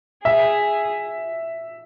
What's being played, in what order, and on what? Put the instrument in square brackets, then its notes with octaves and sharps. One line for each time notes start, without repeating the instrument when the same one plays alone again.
[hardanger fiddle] G#4 [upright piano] E5